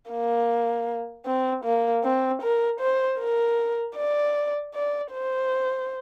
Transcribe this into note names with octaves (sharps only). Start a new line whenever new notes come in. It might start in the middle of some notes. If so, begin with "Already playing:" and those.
A#3
C4
A#3
C4
A#4
C5
A#4
D5
D5
C5